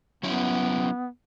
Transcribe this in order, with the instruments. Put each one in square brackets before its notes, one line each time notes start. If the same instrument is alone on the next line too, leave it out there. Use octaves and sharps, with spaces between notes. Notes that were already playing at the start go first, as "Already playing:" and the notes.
[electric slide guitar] F#3 C#4 E4 [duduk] B3